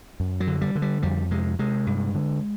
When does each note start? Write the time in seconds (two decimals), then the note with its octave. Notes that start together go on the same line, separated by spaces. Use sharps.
0.20 F#2
0.40 F#3
0.47 D3
0.61 G3
0.75 D3
0.82 G3
1.02 F2 G3
1.31 C3 G#3
1.59 C3 G#3
1.87 G2
2.15 D3